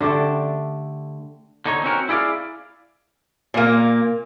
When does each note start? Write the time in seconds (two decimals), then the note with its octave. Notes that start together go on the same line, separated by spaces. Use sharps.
0.01 D3 A3 G4 A4
1.66 D3 D#4 C#5
1.83 C4 C#4 F#4 A#4
2.09 E4 G#4 D5 D#5 F5
3.54 A#2 A#3